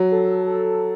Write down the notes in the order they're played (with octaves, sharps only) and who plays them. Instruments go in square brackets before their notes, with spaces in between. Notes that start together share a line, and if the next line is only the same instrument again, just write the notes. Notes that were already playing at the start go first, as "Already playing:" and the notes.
Already playing: [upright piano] F#3
[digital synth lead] A4
A4